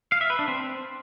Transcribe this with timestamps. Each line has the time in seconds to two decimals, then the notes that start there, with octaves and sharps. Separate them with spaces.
0.12 F5
0.21 E5
0.30 B4
0.39 D4
0.48 C4